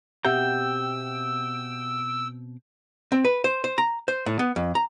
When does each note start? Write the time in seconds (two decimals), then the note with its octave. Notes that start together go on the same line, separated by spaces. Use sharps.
0.25 B2 C4 G4 E5 F#5 G5 A#5 E6
3.12 C4
3.25 B4
3.44 C5
3.64 C5
3.78 A#5
4.08 C5
4.26 A2
4.39 B3
4.56 F2
4.75 A#5